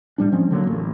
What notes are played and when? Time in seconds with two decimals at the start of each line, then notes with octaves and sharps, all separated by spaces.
0.18 A2 G3 D4
0.32 F3 G#3 C4 C#4
0.51 D3 F#3 G3 A#3
0.67 A1